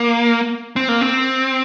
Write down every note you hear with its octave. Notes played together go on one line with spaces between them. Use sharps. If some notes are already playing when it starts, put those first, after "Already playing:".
Already playing: A#3
C4
A#3
C4